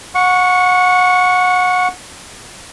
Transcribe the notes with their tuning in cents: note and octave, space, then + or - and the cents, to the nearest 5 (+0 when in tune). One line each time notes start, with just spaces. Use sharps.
F#5 -30 C#6 +0